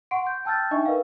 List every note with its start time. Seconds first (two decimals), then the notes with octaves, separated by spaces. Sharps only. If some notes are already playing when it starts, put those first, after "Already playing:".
0.11 F#5 C6 C#6 D7
0.27 G6
0.45 G5 A5 E6 F6 G6 A6
0.71 D4 D#4 D#5 E5 G5 C#6
0.86 A#4 B4 D#5 F5